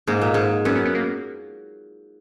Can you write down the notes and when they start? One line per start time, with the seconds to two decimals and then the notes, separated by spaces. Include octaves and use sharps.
0.07 G#2 A#3
0.21 A#2
0.34 G#2
0.65 F#2 B3
0.75 B3
0.85 B3
0.95 A#3